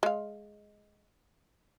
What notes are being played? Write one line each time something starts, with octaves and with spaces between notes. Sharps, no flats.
G#3 F5